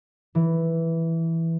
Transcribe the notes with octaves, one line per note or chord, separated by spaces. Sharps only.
E3